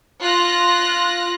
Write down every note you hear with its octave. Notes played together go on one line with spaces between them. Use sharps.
F4 F#6 A#6